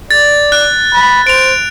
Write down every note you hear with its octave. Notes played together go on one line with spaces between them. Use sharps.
D5 A6
F#6
B5
C5 D7 F7